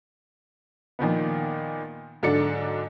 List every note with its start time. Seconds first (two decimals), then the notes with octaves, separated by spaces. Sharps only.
0.99 A#2 D#3 F3 B3
2.23 G#2 D3 F#3 D4 A6 C#7